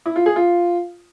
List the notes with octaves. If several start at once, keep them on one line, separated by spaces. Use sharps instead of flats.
E4
F4
G#4
F4